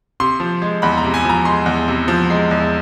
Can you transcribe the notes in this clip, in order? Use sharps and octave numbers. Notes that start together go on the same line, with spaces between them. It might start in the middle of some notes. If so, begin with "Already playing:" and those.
C3 C6
F3
G#3
E2 B5
A#5
C3
G#5
F3 A#5
G#3 C6
E2
C3
F3
G#3
E2